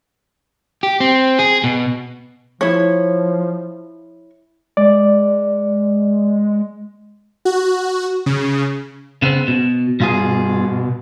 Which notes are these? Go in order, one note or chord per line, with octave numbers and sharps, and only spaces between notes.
G4
C4
G#4
B2
F3 E4 C#5
G#3 D5
F#4
C#3
C#3 B3 C4
B2
G2 B2 F4 G#4